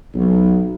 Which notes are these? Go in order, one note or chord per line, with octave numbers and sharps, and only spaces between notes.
B1